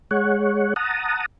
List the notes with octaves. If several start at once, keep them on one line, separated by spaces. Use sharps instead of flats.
G#3 C#5 F#5
F#5 A5 A#5 D#6